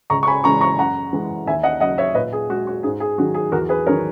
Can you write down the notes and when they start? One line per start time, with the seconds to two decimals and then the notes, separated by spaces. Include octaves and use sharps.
0.10 C#2 A#5 C#6
0.23 C#6
0.27 G#5 B5
0.44 C#3 E3 G#3 A#5 C#6
0.61 A#5 C#6
0.78 F#2 F#5 A#5
1.13 E3 G#3
1.46 D#2 E5 G#5
1.63 D#5 F#5
1.80 C#3 F#3 D#5 F#5
1.98 C#5 E5
2.15 A#2 B4 D#5
2.33 G#4
2.49 G#3 F#4
2.67 F#4
2.83 G#2 G#4
3.00 G#4
3.18 D#3 F#3 F#4
3.34 G#4
3.52 E2 F#4 A#4
3.69 G#4 B4
3.87 D#3 F#3 A#4 C#5